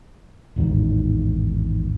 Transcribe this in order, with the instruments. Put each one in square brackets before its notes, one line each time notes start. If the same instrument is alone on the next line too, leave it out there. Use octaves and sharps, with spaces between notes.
[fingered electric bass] A1 E2 G#2 D#3